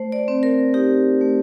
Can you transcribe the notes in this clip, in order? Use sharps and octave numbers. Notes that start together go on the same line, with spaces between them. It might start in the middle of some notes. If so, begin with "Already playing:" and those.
Already playing: A3 C5
D5
C4
A#4
D#4 G4
A3